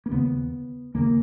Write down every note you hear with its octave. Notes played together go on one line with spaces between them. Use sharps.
A#3
D#2 C#3 B3
D#2 C#3 A#3